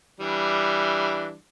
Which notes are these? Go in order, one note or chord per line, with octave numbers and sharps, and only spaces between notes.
E3 G3 D4